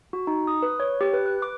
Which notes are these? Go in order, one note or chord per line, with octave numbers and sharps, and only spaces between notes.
F#4
D#4
D#6
B4
C#5
G4
B4
F#6
D6